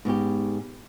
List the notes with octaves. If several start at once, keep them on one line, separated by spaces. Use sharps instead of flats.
G#2 B3 C#4 G4